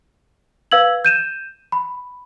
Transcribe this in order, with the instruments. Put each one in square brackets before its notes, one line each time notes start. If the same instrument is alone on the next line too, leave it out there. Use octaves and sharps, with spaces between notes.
[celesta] B4 F5 E6 G#6 F#7
G6 D#7 E7
B5